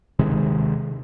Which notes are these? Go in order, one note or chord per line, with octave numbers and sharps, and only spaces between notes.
D#1 C3 D#3 G#3